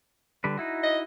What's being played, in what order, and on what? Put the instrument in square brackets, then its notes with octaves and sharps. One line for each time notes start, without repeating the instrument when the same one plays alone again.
[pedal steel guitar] D3 G3 B4
D#4 E4 F#4
[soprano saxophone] D#5